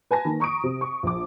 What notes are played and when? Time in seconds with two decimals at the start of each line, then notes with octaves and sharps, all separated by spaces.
0.11 B4 G#5 A5 A#6
0.25 D#3 A#3
0.40 A#5 C#6 D#6 D7
0.64 C3
0.81 C#6
1.03 A#1 D6